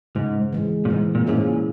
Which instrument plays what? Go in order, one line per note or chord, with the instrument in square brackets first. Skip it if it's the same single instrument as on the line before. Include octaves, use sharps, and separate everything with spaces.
[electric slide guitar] G#2 [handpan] C#3
[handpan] E3 G#3
[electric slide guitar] A#2
[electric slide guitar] G#2 [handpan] E3
[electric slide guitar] A#2
[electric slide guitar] G#2 [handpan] A#3 C#4 E4 G#4
[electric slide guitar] A#2